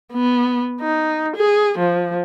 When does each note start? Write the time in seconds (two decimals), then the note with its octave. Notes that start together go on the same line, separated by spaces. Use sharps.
0.13 B3
0.81 D#4
1.36 G#4
1.78 F3